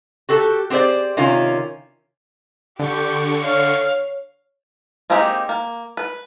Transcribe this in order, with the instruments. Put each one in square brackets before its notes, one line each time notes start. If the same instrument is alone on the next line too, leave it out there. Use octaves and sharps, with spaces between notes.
[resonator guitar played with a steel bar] F#4 G4 A4
C4 G4 G#4 C5 D5
C3 D#3 C#4 F4
[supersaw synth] D3 C#6 [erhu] G4
[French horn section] C#5 [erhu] F5
[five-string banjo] G#3 A#3 C4 D#4 G4
A#3
B4